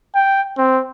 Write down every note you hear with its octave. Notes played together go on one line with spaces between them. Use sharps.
G5
C4